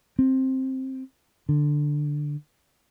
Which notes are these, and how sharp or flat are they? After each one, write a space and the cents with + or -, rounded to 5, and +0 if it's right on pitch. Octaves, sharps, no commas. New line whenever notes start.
C4 +10
D3 +5